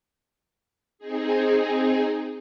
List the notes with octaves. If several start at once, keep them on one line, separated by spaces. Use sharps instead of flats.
C4 D#4 G#4